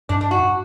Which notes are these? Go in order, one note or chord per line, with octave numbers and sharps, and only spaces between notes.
G2 D4
D4
F#4